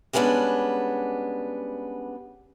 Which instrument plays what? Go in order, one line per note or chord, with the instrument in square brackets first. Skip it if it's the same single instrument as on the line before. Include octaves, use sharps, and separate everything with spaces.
[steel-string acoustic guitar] G3 G#3 B3 C#4 D4